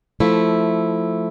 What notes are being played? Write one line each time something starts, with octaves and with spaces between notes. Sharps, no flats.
F3 A3 E4